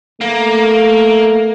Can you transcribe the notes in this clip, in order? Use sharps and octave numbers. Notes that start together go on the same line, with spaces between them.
A3 A#3